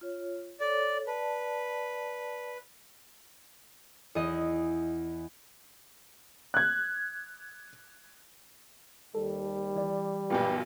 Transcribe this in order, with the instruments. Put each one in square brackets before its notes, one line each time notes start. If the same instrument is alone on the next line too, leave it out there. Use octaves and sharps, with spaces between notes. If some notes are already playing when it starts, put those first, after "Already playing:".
[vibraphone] F4 C#5
[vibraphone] A4 C#5 [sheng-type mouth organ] D5
[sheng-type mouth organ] B4 [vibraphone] D5 A5
[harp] E2 D#5
[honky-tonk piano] F#6 G#6
[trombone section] D#2 [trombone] G3 [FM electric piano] A4
[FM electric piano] E3 D5
[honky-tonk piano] B1 F#2 A#2 [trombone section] G4 B4